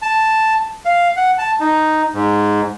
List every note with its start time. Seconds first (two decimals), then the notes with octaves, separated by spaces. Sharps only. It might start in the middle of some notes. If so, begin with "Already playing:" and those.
0.02 A5
0.86 F5
1.16 F#5
1.38 A5
1.60 D#4
2.13 G#2